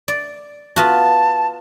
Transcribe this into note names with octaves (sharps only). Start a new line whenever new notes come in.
D5
B3 F4 F#4 A5